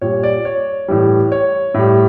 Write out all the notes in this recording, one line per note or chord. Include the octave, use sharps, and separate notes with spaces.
A#2 G3 C#5
D5
C#5
A2 E3 G3
C#5
A2 G3